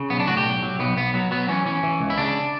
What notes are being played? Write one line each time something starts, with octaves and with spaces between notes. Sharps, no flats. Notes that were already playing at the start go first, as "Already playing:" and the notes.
Already playing: C#3
B1 B3
D4
A2 F#4
G4
B1
F#3
B1 B3
B1 B3
F#3 B3
F#3 B3
E3 C#4
E3 C#4
E3
C#2
E4
C#3 D4